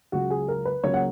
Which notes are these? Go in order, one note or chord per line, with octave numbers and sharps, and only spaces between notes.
C#2 C#3 F#3 F#4
G#4
A#4
B4
C#2 C#3 F#3 A#3 C#5
F#5